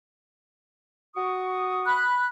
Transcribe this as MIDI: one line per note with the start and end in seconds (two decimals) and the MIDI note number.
1.16 2.06 66
1.16 2.06 85
1.16 2.06 87
1.86 2.26 83
1.86 2.26 90